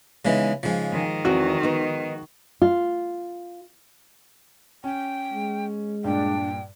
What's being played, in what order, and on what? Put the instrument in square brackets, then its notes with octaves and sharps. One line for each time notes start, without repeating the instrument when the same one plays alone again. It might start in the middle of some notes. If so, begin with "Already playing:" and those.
[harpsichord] C#3 E3 [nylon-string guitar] G#3 B3 D#4
[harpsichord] G#2 F3 [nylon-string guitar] C#3 G#3
[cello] D#3
[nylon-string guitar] E2 C4 E4 [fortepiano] F#4
[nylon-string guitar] B3 D#4
F4
[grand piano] C#4 [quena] G5
[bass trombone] G#3
[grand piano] G2 A#2 [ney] D4 [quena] G5